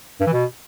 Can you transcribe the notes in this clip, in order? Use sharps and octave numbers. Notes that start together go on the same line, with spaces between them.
G2
E3
B2